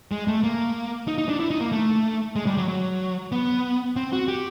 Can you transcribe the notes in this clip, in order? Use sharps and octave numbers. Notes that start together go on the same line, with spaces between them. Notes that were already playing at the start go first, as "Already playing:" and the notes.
G#3
A3
A#3
D#4
D#4
D4
E4
D#4
A#3
A3
G#3
G3
F#3
F#3
B3
C4
F#4
G4